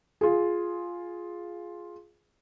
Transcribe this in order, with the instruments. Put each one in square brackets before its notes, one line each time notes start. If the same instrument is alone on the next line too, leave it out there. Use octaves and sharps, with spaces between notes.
[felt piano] F4 G#4